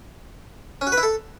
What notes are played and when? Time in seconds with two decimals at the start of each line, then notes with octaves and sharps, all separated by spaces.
0.81 C#4
0.87 F#4
0.92 B4
0.98 E4
1.03 A4